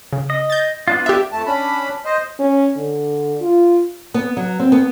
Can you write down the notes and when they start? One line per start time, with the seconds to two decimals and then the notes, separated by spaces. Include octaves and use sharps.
0.13 C#3
0.30 D#5
0.50 G6 A6
0.88 B3 D4 F4
1.06 G4 E5
1.32 F2 A3 A5
1.46 C#4 D4 B5
2.05 C5 D#5
2.39 C#4
2.77 D3
3.41 F4
4.14 B3
4.37 F#3
4.59 C4
4.72 B3